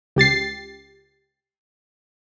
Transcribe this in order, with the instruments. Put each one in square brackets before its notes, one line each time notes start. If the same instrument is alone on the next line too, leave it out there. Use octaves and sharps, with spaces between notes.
[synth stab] C#2 G4 A6 C7